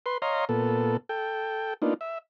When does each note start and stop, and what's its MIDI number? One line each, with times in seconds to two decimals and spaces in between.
0.06 0.18 71
0.06 0.18 84
0.22 0.45 73
0.22 0.45 75
0.22 0.45 77
0.22 0.45 82
0.22 0.45 84
0.49 0.97 46
0.49 0.97 59
0.49 0.97 69
1.09 1.74 69
1.09 1.74 79
1.82 1.94 58
1.82 1.94 59
1.82 1.94 62
1.82 1.94 63
1.82 1.94 65
2.01 2.18 76